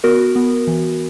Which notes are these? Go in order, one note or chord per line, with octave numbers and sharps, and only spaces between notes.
B3 F#4 A#4
B3
E3